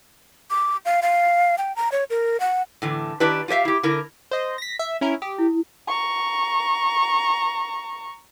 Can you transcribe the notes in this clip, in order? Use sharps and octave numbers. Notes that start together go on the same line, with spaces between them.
D6
F5
F5
G5
A#5
C#5
A#4
F#5
A2 D3 E3
D#3 D4 E4 G4 B4
F4 G4 C5 E5 F5
E4 G4
D3 E4 A#4
C5 D#5
A#6 B6
E5
C#4 E4 A#4
G4 D#6
E4
A#5 C#6